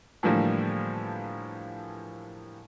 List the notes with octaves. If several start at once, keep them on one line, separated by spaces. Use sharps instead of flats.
A2 D3 E3 F3 G3 A#3